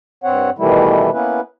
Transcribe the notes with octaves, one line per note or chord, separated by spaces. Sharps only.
G2 C4 C#5 F#5
B2 D#3 E3 G3 A3 E4
A#3 B3 C#4 E4 B4